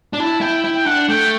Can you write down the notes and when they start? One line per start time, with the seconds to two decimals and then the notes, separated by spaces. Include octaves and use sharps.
0.13 D4
0.19 E4 A5
0.41 E4 G5
0.64 E4
0.75 G5
0.86 D4 F#5
1.09 A3 G5